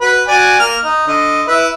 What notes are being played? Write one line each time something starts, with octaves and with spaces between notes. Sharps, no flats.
F#4 B4
F#4 D5 G#5
A#3 F6
D#4
D3 D#5
E4 B4 E5